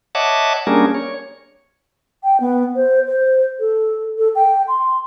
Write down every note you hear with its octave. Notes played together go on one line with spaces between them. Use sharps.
C#5 D#5 E5 F#5 A5 D6
G3 A#3 C#4 D4 G#4 A#4
C#5
G5
B3
C5
C5
A4
A4
G5
C6